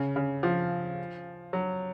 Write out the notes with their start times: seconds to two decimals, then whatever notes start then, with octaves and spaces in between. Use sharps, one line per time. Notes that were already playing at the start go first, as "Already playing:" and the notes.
Already playing: C#3
0.16 C#3
0.43 F3
1.53 F#3